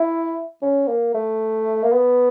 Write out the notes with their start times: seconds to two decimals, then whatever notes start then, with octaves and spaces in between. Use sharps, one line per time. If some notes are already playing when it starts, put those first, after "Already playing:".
Already playing: E4
0.62 C#4
0.88 A#3
1.14 A3
1.84 A#3
1.93 B3